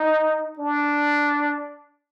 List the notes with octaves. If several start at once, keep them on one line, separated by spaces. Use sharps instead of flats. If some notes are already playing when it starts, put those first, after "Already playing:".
Already playing: D#4
D4